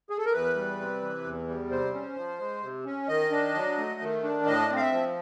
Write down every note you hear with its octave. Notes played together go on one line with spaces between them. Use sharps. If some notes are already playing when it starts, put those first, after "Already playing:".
G#4
A4
A#4
E2 B4
G3
C3
E3
E2
G3
C3 C5
C#4
F3
G#3
C3
C#4
D#3 D#5
D4
F#3
A3
D#3
D4
A2 D#5
C4
F5
E5
F3